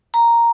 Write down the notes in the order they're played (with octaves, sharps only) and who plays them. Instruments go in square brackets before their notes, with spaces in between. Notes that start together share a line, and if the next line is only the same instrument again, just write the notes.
[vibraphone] A#5